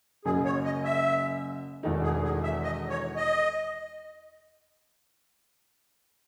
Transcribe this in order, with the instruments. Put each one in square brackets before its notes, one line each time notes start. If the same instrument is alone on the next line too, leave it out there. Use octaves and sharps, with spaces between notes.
[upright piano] F#1 F#2 C#3 [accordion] G#4
[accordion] C#5
D#5
E5
[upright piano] E1 E2 D#3 A3 D#4
[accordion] G#4
G#4
E5
D#5
C#5
D#5